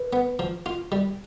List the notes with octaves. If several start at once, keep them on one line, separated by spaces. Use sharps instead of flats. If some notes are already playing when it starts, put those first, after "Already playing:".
Already playing: B4
B3
F3
F4
G3